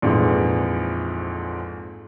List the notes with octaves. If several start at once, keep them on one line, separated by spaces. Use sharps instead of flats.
A#1 F2 G#2 E3